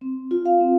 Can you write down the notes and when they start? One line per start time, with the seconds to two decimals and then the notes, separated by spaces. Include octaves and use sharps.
0.01 C4
0.31 F4
0.46 F5
0.61 C4